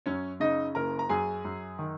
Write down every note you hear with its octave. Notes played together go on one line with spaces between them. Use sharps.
F#2 C#4 C#5
C#3 D#4 D#5
F#1 A#4 A#5
A#5
F#2 G#4 G#5
F#2
D#3